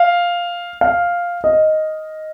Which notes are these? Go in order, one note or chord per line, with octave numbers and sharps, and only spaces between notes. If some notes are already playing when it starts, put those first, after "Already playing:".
Already playing: F5
F5
D#5